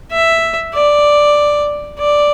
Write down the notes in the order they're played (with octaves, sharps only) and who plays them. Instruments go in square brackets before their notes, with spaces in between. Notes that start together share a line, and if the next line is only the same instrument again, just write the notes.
[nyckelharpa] E5
D5
D5